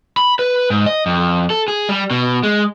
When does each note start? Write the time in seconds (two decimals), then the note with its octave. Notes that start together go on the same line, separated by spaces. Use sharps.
0.17 B5
0.39 B4
0.70 G#2
0.86 D#5
1.06 F2
1.50 A4
1.68 G#4
1.89 G3
2.11 B2
2.43 G#3